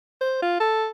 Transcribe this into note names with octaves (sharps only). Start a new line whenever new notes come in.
C5
F4
A4